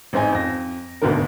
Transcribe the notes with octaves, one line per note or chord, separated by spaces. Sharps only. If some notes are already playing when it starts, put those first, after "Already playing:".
A1 G#2 C4 D#4 G#5
F2 A#6
G#1 D2 B2 D3 A#4